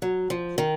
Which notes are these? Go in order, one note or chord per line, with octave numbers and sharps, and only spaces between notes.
F#3
F3
D#3